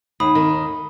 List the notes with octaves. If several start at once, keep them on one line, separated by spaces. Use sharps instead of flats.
D#2 B5 D#6
D#3